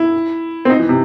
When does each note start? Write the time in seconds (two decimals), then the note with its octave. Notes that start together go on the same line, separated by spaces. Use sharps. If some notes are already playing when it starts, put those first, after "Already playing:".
Already playing: E4
0.65 C4
0.70 D#4
0.79 E3
0.89 C3